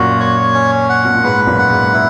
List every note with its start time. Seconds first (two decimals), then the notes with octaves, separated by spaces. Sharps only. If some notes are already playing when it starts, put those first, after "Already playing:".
Already playing: F#2 A#2 F#4
0.20 C#5
0.54 C#4
0.89 F#5
1.05 B2
1.14 A#2
1.24 G#2 B4
1.47 F#2 A#2
1.59 F#5
1.70 G#2
1.93 E4